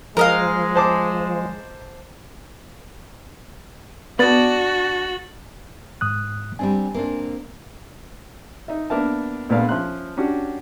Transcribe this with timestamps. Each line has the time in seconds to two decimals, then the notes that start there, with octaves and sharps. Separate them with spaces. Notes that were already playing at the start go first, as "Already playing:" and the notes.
0.17 F3 G#3 A#4 D#5 F5
0.76 C5 A5 D6
4.19 B3 D4 F#4 G#4 D5 A6 F#7
6.01 G#2 D#6 F#6
6.59 G3 C4 D4 G#5
6.94 A#3 C4 D4
8.68 D#4 E5
8.90 A#3 B3 D4 A#4 E5 A5
9.49 A#1 A#2 A3 B3 D5 F5
9.69 F3 C#4 E5 C6 F#6
10.17 C#4 D4 F#4 G4